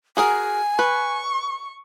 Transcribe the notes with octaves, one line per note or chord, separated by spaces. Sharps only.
F#4 G#4 A#4 G#5
B4 C#6